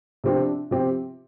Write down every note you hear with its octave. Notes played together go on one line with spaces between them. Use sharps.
C3 F3 C4 D4 G4
C3 F3 C4 G4